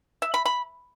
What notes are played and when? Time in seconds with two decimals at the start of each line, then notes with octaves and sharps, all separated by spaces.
0.22 E5
0.34 B5
0.45 B5